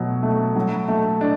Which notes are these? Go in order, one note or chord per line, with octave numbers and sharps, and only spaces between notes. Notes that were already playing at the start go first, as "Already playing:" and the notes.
Already playing: B2 F#3 A3
A3
F#3
A3
D4